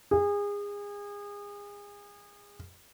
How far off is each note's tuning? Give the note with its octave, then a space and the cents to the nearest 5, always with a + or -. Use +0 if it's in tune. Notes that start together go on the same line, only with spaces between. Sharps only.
G#4 -30